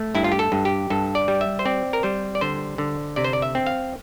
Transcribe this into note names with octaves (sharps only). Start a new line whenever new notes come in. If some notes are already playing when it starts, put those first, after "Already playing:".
Already playing: A3
G2 E4
F4
G4
A4
G2
G4
G2 A4
D5
G3
E5
C5
C4 D5
A#4
G3 C5
D5
D3 C5
D3
C3 D5
C5
D5
E5
C4
F5